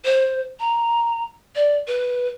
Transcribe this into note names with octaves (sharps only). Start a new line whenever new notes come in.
C5
A#5
D5
B4